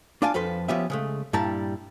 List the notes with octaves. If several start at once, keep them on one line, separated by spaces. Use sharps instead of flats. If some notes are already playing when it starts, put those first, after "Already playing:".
D4 F4 D5 F5 G#5 A5
F2 F3 A4 B4 C6
F3 B3 C#4 G4 B4 E5
C#3 G#3 A3
G2 A#2 G3 E4 A5 A#5